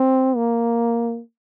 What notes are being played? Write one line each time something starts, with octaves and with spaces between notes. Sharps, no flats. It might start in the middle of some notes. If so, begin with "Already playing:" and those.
Already playing: C4
A#3